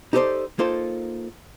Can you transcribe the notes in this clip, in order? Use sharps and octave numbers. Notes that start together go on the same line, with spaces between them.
D#4 G4 A4 A#4 C5 D5
A#3 D#4 F4 A4 C5